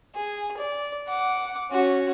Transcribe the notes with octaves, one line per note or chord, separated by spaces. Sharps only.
G#4
D5
F#5 D6
C#4 F#4